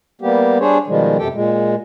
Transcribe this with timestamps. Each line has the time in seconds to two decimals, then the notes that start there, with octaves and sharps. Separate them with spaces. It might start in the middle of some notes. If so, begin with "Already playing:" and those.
0.22 G3 A#3 B3 G4
0.60 G3 D4 G#4 C5 C#5
0.87 B2 D#3 F3 G3 G#3
1.18 F#2 C3 G4 A4 G5
1.34 A#2 G#3